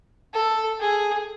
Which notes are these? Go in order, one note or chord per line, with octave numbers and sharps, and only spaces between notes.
A4
G#4